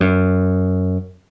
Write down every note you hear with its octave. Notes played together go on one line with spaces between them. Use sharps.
F#2